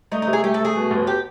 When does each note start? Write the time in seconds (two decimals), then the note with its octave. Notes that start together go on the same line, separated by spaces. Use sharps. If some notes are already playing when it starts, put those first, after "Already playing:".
0.12 A3 D#4
0.22 D#4
0.27 C3
0.33 G#4
0.43 A3 G4
0.54 A4
0.60 A3 G#4
0.75 B2
0.91 F1
1.07 G4